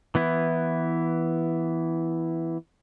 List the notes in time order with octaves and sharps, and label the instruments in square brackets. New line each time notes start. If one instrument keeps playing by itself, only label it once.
[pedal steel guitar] E3 B3 E4